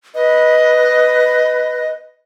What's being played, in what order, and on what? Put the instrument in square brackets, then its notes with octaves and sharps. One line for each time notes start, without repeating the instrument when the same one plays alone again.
[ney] B4 [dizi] D#5